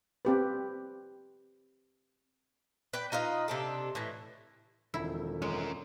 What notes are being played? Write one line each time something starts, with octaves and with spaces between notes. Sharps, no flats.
C4 G4 B4
B4 D5 G5
D#4 F4 B4 D#5
C3 D4 A4
A2 E3
E1 F2 D#3 E4
G#3 C#4 A#4